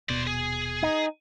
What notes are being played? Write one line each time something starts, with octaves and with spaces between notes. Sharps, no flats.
D#1 B2 C5 D5
G#4
D#4